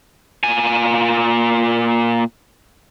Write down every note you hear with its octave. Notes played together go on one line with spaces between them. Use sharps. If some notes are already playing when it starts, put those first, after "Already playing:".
A#2 G#5